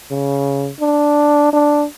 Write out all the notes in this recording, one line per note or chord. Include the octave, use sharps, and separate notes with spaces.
C#3
D4
D4